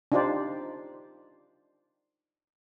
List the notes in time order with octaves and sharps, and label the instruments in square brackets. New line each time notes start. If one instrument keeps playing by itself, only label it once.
[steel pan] D4 D#4 F4 G4 C5 D5